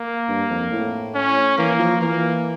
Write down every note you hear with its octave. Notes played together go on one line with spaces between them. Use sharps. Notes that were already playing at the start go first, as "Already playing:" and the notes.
Already playing: A#3
G2
F2
A2
C#4
E3 A#3
F3
E3 A#3